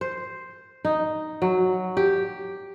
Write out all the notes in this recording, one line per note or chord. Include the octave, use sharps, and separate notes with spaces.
C5
D#4
F#3
G4